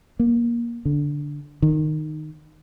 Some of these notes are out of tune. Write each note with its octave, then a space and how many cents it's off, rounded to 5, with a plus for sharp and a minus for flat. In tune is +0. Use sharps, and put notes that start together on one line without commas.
A#3 +20
D3 -10
D#3 -15